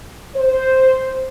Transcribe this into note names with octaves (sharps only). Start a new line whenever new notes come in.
C5